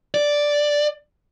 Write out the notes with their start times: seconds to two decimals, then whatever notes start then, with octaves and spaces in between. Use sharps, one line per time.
0.14 D5